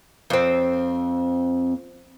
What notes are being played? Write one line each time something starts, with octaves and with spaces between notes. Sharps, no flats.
F2 C4